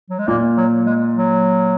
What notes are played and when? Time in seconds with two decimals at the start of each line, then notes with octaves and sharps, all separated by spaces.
0.10 F#3
0.19 G#3
0.28 A#2 A#3
0.57 F#3
0.86 G#3
1.15 F#3